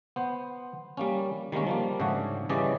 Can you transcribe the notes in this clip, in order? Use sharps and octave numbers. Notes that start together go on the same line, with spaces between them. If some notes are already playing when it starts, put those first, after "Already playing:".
B3 C5
G3 A#3 C#4
D#3 G3 G#3 A#3 C#4
F3 G3 A#3
G#2 C#3 A3 D4 F#4
C#3 E3 G3 C#4 D5 D#5